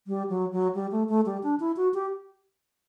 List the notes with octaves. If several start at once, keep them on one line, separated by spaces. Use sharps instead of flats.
G3
F#3
F#3
G3
A3
A3
G3
D4
E4
F#4
G4